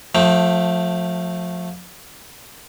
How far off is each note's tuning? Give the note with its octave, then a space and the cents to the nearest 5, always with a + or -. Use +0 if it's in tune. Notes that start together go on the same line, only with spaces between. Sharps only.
F3 +30 A3 +0 G5 +0